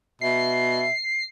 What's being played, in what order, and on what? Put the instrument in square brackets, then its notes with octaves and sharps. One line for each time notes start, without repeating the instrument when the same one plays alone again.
[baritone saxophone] B2 [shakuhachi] E5 [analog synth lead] C7